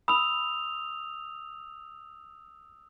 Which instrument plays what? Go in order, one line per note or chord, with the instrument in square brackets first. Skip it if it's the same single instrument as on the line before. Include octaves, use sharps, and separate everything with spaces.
[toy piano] B5 [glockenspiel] D#6 E6 F7